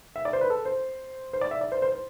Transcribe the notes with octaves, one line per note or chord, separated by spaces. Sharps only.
E5
D5
C5
B4
A4
C5
C5
D5
E5
D5
C5
C5
C5